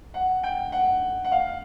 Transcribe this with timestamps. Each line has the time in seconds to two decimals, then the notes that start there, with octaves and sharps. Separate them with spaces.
0.14 F#5
0.43 G5
0.72 F#5
1.24 F#5
1.32 F5